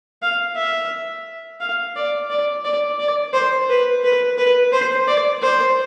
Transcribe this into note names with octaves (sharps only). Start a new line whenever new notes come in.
F5
E5
F5
D5
D5
D5
D5
C5
B4
B4
B4
C5
D5
C5